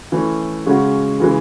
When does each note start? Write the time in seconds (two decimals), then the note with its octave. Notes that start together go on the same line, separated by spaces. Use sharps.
0.12 E3 A3 C#4
0.66 C#3 G#3 C#4 F#4
1.20 C#3 E3 G#3